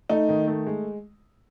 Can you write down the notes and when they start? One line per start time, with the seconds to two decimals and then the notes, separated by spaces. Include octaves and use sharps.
0.10 A3 D#4
0.29 D#3
0.47 A3
0.67 G#3